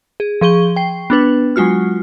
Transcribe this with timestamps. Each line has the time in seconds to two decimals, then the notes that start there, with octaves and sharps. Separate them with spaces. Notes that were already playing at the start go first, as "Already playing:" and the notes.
0.20 G#4
0.41 F3 G#4 C#6 G7
0.76 G5 C7
1.10 B3 D4 B4
1.56 F#3 G#3 F4 F#4 F6